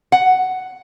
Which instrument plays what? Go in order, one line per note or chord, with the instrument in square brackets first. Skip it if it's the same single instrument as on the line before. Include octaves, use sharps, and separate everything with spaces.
[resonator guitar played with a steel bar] F#5